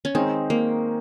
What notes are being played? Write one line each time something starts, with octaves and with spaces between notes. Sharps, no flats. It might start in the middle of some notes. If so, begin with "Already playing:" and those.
C#4
D#3 G#3 C4 D#4 G#4
A#3